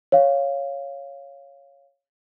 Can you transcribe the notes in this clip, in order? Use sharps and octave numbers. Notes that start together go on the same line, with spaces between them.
C#5 F5